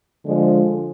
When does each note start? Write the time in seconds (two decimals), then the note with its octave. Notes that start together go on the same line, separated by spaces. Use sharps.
0.25 D3 F3 G#3